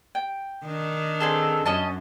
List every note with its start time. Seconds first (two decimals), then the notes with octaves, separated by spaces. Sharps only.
0.15 G5
0.65 D#3 D4
1.20 C4 G#4 A4
1.66 F#2 C#4 D#5 A5